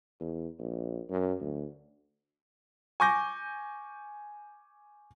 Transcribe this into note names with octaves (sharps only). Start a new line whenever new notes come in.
E2
A#1
F#2
D2
G#5 C#6 D6 G6 A#6